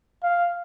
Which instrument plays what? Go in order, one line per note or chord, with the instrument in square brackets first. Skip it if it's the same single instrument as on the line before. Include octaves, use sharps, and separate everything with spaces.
[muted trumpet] F5